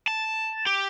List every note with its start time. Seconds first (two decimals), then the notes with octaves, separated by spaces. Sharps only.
0.08 A5
0.66 G4